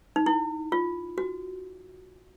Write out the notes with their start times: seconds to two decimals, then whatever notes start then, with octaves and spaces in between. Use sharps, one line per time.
0.16 D#4
0.26 E4
0.72 F4
1.18 F#4